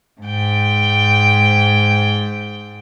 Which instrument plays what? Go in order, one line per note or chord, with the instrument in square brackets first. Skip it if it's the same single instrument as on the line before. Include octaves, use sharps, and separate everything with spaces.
[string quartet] G#2 G5